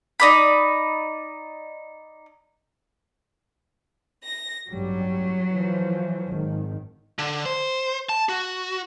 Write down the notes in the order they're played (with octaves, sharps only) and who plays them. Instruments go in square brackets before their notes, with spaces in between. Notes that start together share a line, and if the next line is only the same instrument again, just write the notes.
[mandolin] D#4 D5 B5
[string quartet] A#6
[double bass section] A1 G2 G3 [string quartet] F#3
[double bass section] E3 F3
G#1 D#3
[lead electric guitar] D3
C5
A5
F#4